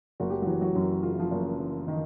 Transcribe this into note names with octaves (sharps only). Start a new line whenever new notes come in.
F#1 F#4
G4
F#3 F#4
E3
F#3 F#4
F#2
C#3 F4
E4
F3 F4
F#1
E3
D#3 D#4